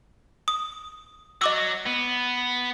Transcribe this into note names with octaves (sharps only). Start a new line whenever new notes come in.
D#6
F#3 F#4 D#5 D6 E6
B3